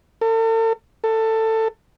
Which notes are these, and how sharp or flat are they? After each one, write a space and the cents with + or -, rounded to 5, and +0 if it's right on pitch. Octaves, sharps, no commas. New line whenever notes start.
A4 +40
A4 +15